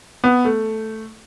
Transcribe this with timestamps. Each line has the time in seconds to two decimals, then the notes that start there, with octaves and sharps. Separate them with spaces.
0.24 B3
0.45 A3